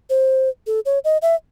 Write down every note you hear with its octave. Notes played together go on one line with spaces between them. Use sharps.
C5
A4
C#5
D#5
E5